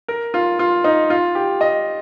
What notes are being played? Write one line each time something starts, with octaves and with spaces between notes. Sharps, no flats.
A#4
F4
F4
D#4
F4
G4
D#5